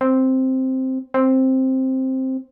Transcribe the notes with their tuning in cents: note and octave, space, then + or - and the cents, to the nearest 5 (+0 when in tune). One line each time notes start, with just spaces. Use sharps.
C4 +0
C4 +5